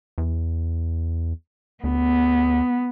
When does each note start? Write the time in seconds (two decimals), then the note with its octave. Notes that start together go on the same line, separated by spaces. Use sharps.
0.18 E2
1.84 D2 B3